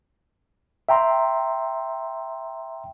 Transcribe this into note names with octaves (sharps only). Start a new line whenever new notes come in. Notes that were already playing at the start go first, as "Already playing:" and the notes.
E5 G5 A#5 C6